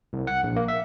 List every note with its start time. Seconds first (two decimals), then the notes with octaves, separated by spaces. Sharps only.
0.13 C2
0.27 F#5
0.43 A#1
0.56 A#3
0.68 E5